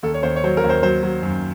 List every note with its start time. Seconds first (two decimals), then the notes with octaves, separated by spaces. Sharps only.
0.03 D#2 A4
0.14 C#5
0.23 D#2 C5
0.36 C#5
0.44 F#3 C5
0.57 A#4
0.64 D#2
0.70 C5
0.83 F#3 C5
1.03 F#3
1.23 F#2